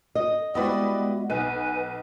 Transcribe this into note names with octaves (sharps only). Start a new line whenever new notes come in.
D#5
G3 G#3 B3 E4 F#4 B4 D5 D#5
B1 B3 B4 G#5